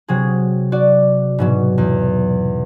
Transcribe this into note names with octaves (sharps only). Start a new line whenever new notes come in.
C3 F#3 G#4
F#4 D5
G#2 B2 F#3
E2